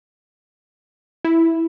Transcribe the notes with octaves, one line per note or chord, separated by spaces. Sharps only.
E4